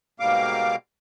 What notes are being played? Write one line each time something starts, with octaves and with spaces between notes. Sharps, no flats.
G#2 B2 G3 A#3 F5 D6